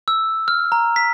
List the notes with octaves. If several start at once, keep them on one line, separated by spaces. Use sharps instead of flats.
E6
F6
A#5
B6